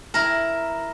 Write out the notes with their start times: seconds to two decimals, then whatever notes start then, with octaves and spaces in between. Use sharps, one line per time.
0.14 E4 A#4